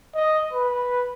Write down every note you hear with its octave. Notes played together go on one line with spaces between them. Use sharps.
D#5
B4